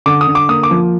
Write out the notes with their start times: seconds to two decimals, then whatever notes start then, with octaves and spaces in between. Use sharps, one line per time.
0.06 D3 D6
0.21 D#6
0.27 D3
0.35 D6
0.49 A#3 D#6
0.63 D6
0.71 F3